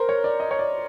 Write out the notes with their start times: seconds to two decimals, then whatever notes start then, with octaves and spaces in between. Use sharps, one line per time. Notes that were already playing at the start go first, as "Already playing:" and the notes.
Already playing: A#4 C5
0.09 C#5
0.24 D5
0.40 D#5
0.51 C#5
0.59 D5